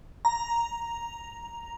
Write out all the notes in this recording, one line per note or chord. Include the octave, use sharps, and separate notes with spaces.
A#5